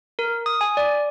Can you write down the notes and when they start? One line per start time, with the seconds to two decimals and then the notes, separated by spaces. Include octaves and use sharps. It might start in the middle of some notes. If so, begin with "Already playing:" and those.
0.19 A#4
0.46 D#6
0.61 G#5
0.77 D5